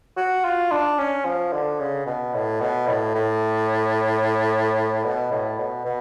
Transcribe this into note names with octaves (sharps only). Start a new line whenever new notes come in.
F#4
F4
D4
C#4
F3
D3
C#3
B2
A2
B2
A2
A2
B2
A2
B2
B2